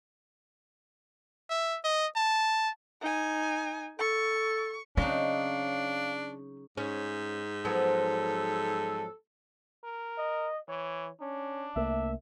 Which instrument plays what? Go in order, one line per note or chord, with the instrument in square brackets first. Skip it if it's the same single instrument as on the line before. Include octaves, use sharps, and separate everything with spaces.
[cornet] E5
D#5
A5
[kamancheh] D#4 G#5
[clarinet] A4 [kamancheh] C#6
[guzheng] C#3 F#3 D#4 [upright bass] C4 [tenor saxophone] D4 [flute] F5
[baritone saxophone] G#2 [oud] C#4
[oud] F3 F#3 B3 [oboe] A4
[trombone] A#4
[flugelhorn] D#5
[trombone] E3 [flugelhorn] C#5
[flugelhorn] C#4 [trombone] D4
[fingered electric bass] C2 A3 A#3 [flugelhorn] E5